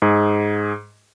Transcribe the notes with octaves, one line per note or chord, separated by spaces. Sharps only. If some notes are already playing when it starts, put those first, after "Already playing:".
G#2 G#4